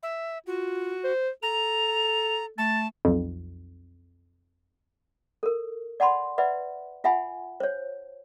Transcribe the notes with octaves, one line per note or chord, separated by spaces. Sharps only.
E5
F4 F#4
C5
A4 A#5 F7
A3 A5 A6
B1 F2
A4 A#4
D5 F#5 A5 B5 C6
B4 D5 E5 F#5 B5
F4 E5 F#5 G#5 B5
C5 C#5